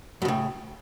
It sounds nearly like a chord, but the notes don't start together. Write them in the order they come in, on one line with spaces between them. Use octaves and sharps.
F#2 C#3 A2